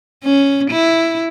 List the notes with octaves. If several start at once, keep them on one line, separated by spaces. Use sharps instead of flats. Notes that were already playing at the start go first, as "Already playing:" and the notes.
C#4
E4